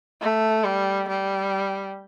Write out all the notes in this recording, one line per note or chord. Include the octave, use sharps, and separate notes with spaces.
A3
G3
G3